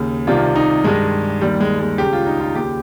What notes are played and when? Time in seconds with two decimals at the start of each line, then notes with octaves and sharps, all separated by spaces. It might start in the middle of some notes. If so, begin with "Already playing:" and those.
Already playing: D#2 C#3
0.27 C2 C3 D#3 F4
0.56 D#4
0.84 G2 D#3 G#3
1.41 D#2 D#3 G3
1.60 G#3
1.79 G#3
1.98 C#2 C#3 G4
2.13 F4
2.27 D#4
2.41 F4
2.55 D#2 C#3 G4